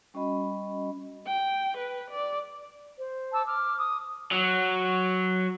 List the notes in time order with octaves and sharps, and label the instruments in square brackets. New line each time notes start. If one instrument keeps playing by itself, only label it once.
[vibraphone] G3 C#4 F#4 D#5 B5
[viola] G5
B4
D5
[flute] C5
[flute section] A5 D6 E6
[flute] D6 [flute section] F6
[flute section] D#6
[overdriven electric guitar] F#3